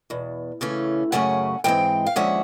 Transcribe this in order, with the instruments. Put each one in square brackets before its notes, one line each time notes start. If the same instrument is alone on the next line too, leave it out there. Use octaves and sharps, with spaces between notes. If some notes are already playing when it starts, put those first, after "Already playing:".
[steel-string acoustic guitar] E2 B2
C#3 E3 A3 C#4
F#2 C#3 F#3 A3 C#4 F#5 G#5
G#2 E3 G#3 C4 G5
F5
D#2 D3 F3 G#3 C#4 E5 F#5